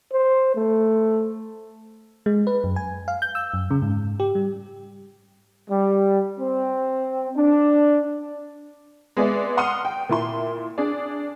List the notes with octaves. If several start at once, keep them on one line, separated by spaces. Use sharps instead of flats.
C5
A3
G#3
B4
F#2
G#5
F5
G6
E6
F#2
C#3
G#2
G4
G3
G3
C4
D4
G#3 B3 G#4 D5 E5
F#5 C6 D#6 F6 D#7
G5
A#2 E4 C6
D4 G#4 D5